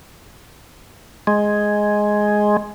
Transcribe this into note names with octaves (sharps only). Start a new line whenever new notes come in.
G#3